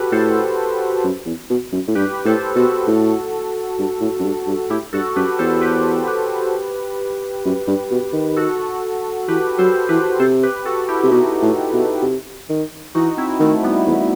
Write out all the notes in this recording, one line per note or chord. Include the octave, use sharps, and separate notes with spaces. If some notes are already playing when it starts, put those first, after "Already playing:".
Already playing: F#4 G4 A4 B4
A2 A4 C5
F#2
E2
B2
F#2
A2
G2 G4 B4
A2 A4 C5
B2 F#4 A4
A2
G2
A2
F#2
G2
G2
A2 E4 G4
G2 F#4 A4
F#2 G4 B4
E2 A4 C5
G4 B4
G4 B4
F#2
G2
B2
D#3
F#4 A4
E3 G4 B4
F#3 A4 C5
E3 G4 B4
C3 A4 C5
G4 B4
F#4 A4
E4 G4
C3
B2 D#4 F#4
A2
B2
C3
D#3
E3 D#4 F#4
C4 E4
D#3 A3
G3 B3
E2